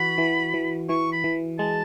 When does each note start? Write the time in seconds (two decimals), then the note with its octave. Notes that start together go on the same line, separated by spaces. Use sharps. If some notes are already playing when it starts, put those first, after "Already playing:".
Already playing: E3 F#4 B5
0.18 E3
0.54 E3
0.89 E3 C#6
1.12 B5
1.24 E3
1.59 G#3 A5